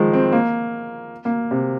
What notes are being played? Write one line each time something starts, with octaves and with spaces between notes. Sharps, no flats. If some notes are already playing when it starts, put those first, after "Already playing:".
Already playing: D#3 F3 G#3
C4
A#3
A#3
C3